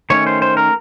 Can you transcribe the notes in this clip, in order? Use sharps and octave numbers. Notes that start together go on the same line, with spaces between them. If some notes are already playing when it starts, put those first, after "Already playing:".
D#3 A3 C#4 C#5
C5
C5
A#4